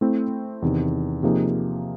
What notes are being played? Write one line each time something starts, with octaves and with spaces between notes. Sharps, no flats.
A3 C4 E4
E2 C3 D#3
C3 F3 A#3 D#4 G#4